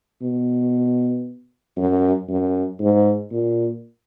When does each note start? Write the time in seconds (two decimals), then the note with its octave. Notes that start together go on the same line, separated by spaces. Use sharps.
0.22 B2
1.77 F#2
2.29 F#2
2.80 G#2
3.32 A#2